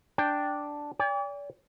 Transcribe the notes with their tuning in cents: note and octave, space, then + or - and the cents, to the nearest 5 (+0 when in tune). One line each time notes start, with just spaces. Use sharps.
D4 +0 G5 +0
D5 -40 G5 +45